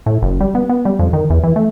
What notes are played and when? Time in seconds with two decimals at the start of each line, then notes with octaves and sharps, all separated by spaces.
0.06 A2
0.22 F#1
0.40 G3
0.55 B3
0.69 B3
0.85 G3
0.99 F2
1.13 D#3
1.30 E2
1.44 E3
1.56 A3